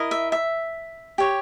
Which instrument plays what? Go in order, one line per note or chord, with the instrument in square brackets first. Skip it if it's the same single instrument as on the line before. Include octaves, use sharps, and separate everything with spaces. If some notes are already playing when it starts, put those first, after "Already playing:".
Already playing: [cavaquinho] E4 A#4 D#5
E5
E5
G4 C#5